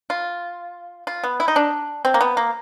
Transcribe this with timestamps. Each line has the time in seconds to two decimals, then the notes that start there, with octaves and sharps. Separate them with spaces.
0.10 F4
1.07 F4
1.24 B3
1.40 E4
1.48 D#4
1.56 D4
2.05 C4
2.14 A#3
2.21 B3
2.37 A#3